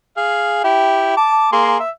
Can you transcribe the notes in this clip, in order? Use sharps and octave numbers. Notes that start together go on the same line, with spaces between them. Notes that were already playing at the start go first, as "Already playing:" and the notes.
G#4 F5
E4 G4
A5 D6
A#3 G#4 C6
E5